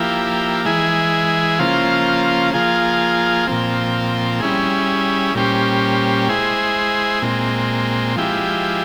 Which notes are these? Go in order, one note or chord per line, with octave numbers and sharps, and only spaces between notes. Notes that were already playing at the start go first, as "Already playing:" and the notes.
Already playing: F3 A#3 E4 G4
E3 G#3 E4 G#4
C#3 F3 A#3 F4 C5
F3 A#3 F4 G#4
A#2 F3 C4
G3 C#4 E4 G#4
A#2 G3 C#4 G4 C5
G#3 E4 G#4 C5
A#2 G#3 C4
F3 G#3 E4 G4